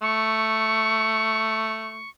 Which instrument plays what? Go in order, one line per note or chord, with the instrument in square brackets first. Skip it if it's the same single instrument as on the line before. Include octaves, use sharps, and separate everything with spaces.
[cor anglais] A3 [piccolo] C#6